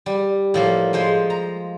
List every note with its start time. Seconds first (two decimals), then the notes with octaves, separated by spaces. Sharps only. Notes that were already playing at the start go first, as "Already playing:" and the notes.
0.06 G3
0.54 A2 F3 A#3
0.93 F3 G#3 C5
1.30 A#5